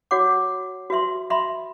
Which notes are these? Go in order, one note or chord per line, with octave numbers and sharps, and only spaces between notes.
F#4 C#5 F#5 D6
F#4 B4 E5 C6
D#5 E5 B5 C6